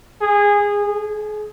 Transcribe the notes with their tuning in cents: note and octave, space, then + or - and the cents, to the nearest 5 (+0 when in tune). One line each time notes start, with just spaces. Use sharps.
G#4 -20
G#4 +35